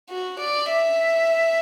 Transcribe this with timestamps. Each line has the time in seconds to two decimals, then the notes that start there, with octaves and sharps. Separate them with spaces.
0.10 F#4
0.40 D5
0.71 E5